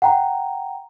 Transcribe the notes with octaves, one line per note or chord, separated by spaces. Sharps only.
F#5 G5 A#5